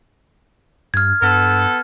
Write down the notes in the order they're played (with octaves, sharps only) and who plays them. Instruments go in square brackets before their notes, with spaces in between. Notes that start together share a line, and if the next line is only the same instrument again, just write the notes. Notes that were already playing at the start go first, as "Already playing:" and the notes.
[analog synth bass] G2 [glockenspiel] F6 G#6
[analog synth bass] G2 [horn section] B3 A4 [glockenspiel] F6